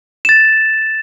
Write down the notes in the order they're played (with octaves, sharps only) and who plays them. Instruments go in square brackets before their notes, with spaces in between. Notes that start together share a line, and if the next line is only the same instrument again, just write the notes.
[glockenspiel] A6 E7